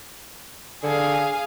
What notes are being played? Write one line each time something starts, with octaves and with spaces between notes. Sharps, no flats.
D3 G#4 F5